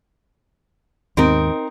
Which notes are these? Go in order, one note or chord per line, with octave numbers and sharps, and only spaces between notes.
D#2 G#2 C4 D#4 A#4